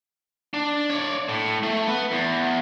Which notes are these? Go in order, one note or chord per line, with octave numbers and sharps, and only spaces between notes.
D4
C#5 D5
A2
A3
B3 B4
E2